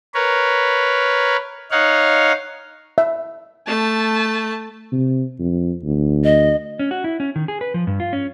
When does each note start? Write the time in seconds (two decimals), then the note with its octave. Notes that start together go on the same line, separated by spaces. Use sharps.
0.14 A#4 B4 C#5
1.71 D#4 C#5 F5 F#5
2.98 E5
3.67 A3 A5
4.92 C3
5.39 F2
5.84 D2
6.24 D#5
6.79 C#4
6.91 F#4
7.04 E4
7.20 C#4
7.36 D#3
7.48 G#4
7.61 B4
7.74 F3
7.87 G2
8.00 F4
8.13 C#4